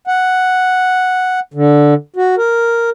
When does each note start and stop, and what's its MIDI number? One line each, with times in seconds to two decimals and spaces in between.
0.07 1.40 78
1.54 1.94 50
2.16 2.35 66
2.38 2.90 70